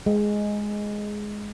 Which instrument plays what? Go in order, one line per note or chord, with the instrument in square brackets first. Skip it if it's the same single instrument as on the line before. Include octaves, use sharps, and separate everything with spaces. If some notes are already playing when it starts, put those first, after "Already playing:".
[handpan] G#3